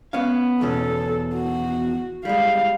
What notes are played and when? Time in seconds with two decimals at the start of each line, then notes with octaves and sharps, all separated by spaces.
0.13 B3 C#4 F5
0.61 E2 B2 C#4 A4
1.34 F#4
2.25 G3 G#3 F5